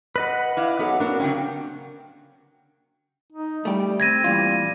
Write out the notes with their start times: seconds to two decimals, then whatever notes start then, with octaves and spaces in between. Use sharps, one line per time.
0.16 B4 D#5 F#5
0.57 E4 F5 D6
0.79 F#3 B3 D#4 A4
1.00 A#3 C4 D4 F#4 A#4
1.20 C#3 F#3 C#4 G4 G5
3.32 D#4
3.65 G3 A3 G4
4.00 C4 G#6 A#6 D#7
4.24 A#2 E3 G3 F4